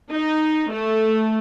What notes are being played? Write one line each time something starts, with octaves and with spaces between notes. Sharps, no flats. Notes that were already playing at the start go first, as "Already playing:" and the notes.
D#4
A3